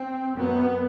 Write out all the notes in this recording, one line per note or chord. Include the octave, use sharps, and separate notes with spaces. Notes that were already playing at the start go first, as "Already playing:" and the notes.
Already playing: C4
F#2 B3